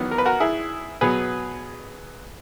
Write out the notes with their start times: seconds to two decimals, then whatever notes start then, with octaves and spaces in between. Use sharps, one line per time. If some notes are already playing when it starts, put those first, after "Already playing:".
Already playing: E2 D#3 F#3 B3
0.11 A#4
0.18 B4
0.25 F#4 A#4
0.40 E4 G#4
1.01 B2 F#3 B3 G#4 B4